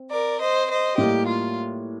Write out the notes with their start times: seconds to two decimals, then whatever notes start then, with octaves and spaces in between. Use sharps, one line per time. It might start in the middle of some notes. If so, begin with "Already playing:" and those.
Already playing: C4
0.12 A#4 D5
0.41 C5 D#5
0.70 C5 D#5
0.98 A2 G3 A#3 G4
1.27 F4